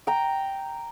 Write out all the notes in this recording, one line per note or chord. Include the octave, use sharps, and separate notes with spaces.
G5 A#5